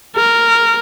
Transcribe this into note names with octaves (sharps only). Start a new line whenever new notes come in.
A#4